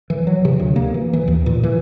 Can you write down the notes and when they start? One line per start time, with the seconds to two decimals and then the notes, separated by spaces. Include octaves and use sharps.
0.10 E3
0.27 F#3
0.45 C3
0.60 D2
0.76 A#3
0.94 E3
1.13 E3
1.28 D#2
1.46 A#2
1.63 E3